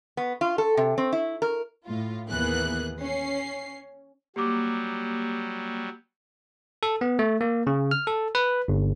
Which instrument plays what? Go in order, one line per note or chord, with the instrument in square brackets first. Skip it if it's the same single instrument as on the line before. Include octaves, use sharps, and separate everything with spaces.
[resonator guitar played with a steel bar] B3
F4
A4
C3
C4
E4
A#4
[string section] A2 F4
D#2 E3 A#3 B3 G#4 F#6
C#4 C7
[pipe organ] F#3 G3 [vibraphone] A#3 [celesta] G4 D6
[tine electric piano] A4
B3
A3
A#3
C#3
F6
A4
B4
G1